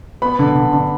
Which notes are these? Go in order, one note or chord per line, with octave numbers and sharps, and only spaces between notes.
B3 B5
D3
D3
D3